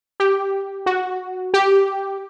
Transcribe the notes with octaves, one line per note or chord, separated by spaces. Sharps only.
G4
F#4
G4